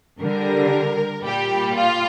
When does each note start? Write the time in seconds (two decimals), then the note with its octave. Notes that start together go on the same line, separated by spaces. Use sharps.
0.21 D3 G3 A#4
1.23 A#2 G3 G4
1.75 F4